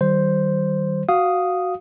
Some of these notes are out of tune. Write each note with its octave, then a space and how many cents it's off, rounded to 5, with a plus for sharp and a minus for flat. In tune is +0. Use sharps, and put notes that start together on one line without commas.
D#3 +0 G3 -30 C5 +0
F#4 +0 F5 +0 D#6 +0